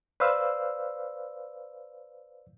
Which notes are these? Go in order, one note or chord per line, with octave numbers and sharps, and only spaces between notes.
B4 C5 D5 F5 E6